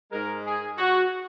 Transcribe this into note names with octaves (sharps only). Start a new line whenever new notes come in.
G#2 G#3 A#4
G#4
F#4